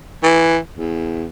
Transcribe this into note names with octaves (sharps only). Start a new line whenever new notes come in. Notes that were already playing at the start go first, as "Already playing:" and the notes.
E3
E2